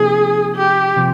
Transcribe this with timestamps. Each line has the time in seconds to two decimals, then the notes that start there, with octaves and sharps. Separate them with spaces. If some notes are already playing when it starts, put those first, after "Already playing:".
Already playing: C3 F3 A#3 D#4 G#4
0.57 G4
0.96 C3 F3